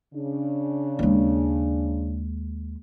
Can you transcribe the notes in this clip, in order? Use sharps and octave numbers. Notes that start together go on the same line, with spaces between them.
C#3 D4
D#2 G#3